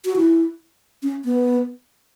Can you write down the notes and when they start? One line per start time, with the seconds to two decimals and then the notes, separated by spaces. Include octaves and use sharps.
0.05 F#4
0.16 E4
1.03 C#4
1.25 B3